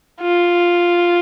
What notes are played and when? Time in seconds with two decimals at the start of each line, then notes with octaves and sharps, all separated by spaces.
0.21 F4